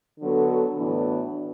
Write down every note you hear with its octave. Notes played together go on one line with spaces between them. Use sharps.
D3 F#3 B3 F#4 A4
A2 E3 B3 D4 F#4